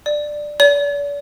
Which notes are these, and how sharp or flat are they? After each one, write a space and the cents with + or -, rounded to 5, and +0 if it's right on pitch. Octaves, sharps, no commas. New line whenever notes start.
D5 +10
D5 -40